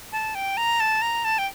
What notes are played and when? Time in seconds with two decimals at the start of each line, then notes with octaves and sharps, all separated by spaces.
0.12 A5
0.35 G5
0.57 A#5
0.80 A5
1.02 A#5
1.24 A5
1.38 G5